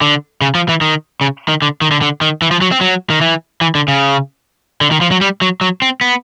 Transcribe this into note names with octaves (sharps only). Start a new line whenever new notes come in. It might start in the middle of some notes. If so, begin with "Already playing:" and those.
D3
C#3
F3
E3
D#3
C#3
D#3
D3
D#3
D3
D3
D#3
E3
F3
F#3
C4
F#3
D#3
E3
E3
D3
C#3
D3
D#3
F3
F#3
G3
F#3
F#3
C4
B3